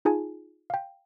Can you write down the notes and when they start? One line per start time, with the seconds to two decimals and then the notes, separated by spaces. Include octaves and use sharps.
0.05 D#4 F4 G#4 G#5 A5
0.70 F5 G5